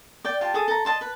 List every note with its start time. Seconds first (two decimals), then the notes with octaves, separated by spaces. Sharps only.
0.25 D5 G5
0.41 F4 G4 G5 A5
0.54 G#4 A4 D#6
0.68 A4 A#5
0.85 D#5 E5 A5 C6
1.01 B4